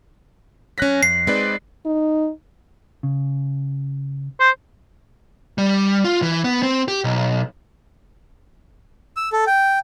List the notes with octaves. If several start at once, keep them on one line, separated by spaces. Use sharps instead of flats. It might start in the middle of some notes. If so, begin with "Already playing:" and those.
F#2 C#4 F#6 A#6 B6
F2 C7
G#3 C4 D#4 B4 D5
D#4
C#3
C5
G3
F4
E3
B3
C4
G4
B1
E6
A4
G5